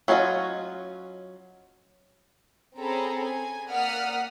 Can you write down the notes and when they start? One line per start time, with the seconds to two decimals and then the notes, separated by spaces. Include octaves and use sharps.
0.08 F#3 C#4 F4 F#4 D#5
2.78 C4 C#4 G#4 A4 A#5 B5
3.25 G#5
3.70 A#3 D5 F#5 D#6 F6 B6